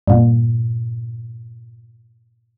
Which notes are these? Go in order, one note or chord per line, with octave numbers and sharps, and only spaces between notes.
G2 A#2